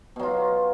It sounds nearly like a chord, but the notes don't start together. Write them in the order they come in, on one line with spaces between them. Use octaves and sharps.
B2 F#3 F4